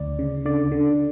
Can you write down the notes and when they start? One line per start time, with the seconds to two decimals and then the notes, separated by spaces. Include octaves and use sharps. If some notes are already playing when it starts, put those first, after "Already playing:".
Already playing: D2 D5
0.19 C#3
0.45 D3 D5
0.72 D3